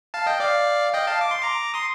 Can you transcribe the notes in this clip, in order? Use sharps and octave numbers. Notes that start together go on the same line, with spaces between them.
F5 A5
D#5 G5
D5 F5
D#5 G5
F5 A5
D6
C6
A#5 D6
C6 D#6